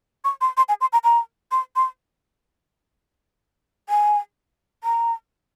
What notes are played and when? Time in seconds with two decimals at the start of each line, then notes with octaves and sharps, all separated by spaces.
0.25 C#6
0.41 C6
0.57 C6
0.69 G#5
0.81 C6
0.93 A#5
1.04 A#5
1.51 C6
1.76 C6
3.89 G#5
4.84 A#5